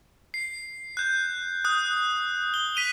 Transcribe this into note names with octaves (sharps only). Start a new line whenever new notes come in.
C7
F#6 G6
D#6 F#6
G7
B6 D#7 F7 G7